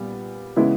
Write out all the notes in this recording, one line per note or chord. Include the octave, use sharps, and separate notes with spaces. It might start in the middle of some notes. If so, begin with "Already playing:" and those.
Already playing: A#2 G3 B3
C#3 E3 G#3 B3 E4